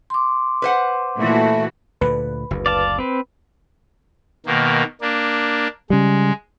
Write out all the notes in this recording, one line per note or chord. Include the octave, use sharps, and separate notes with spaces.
C6 D6
B4 C5 F#5
A#2 E3 A3 F#4
D2 A#2 D3 B4
F#1 D2
D5 F5 A5
C4 B4
B2 D#3 A#3
A#3 D4
C#3 G3 G#3